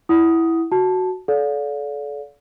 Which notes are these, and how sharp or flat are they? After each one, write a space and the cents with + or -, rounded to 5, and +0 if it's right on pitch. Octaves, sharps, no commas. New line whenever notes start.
E4 +0 F#5 +10 D#6 +5
F#4 +0 A5 -5
A4 -30 D5 -35 F5 +30